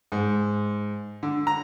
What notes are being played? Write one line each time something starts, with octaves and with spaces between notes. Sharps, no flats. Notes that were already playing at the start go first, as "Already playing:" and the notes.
G#2
D3
A#5